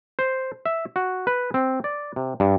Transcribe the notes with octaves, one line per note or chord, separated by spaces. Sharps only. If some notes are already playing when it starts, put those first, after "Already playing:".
C5
E5
F#4
B4
C4
D5
C3
G2